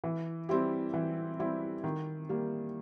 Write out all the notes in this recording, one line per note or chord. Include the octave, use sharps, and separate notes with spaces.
E3
G3 C4 E4 G4
E3
G3 C4 E4 G4
D#3
G3 A#3